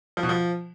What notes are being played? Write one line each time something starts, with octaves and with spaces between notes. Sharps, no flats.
F3
B2
F3